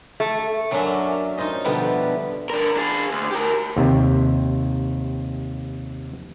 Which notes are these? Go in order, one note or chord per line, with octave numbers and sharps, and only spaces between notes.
A3
F#2 F#3 A#3 C#4 D4 E5
D#4 F4 C5 D#5
B2 D3 F3 G3 B3 E4
D4 A#4
D4 G#4
D2
G4 A#4
D#2 C3